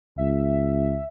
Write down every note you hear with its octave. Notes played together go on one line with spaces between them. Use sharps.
C#2 E5